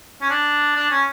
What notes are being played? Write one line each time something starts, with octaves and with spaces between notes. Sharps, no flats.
C#4
D4
D4
C#4